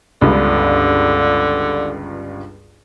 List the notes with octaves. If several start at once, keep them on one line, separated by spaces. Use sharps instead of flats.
G1 C#2 G2 D3